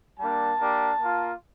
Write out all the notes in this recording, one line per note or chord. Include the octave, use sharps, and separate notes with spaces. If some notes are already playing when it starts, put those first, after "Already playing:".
G3 A#3 D4 A5
A#3 D4 G4
A#3 F4